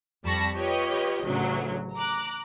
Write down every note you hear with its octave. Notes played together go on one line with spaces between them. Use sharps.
F2 G3 A5 B5 C#6 A#6
F4 G4 B4 C#5 D#5
A1 D2 C#3 F#3
A#5 D6 F#6